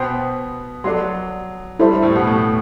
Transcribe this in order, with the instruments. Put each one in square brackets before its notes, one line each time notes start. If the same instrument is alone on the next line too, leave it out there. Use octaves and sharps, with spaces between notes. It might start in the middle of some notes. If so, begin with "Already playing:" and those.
Already playing: [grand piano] B2 B3 [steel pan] C5 G5 C6
[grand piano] F#3 [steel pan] A4 D5 F#5 C6
[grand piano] G3 [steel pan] E4 A4 C5 E5
[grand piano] G3
A2 A3
B2 B3
A2 A3